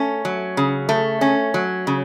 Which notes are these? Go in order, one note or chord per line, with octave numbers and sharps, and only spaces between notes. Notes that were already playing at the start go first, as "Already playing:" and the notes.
Already playing: A3 C#4
F#3
C#3
A3
C#4
F#3
C#3